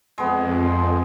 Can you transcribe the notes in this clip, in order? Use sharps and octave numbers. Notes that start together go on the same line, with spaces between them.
F2 G#3 B3